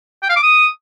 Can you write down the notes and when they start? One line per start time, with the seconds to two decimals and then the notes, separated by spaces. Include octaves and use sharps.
0.23 G5
0.29 F5
0.36 D6
0.43 D#6